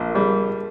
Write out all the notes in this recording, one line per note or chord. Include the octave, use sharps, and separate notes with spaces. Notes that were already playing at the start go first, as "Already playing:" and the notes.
Already playing: A#1
A#4
G3 G#4